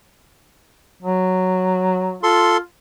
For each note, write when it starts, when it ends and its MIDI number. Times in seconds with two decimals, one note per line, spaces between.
1.02 2.17 54
2.23 2.58 65
2.23 2.57 69
2.23 2.57 84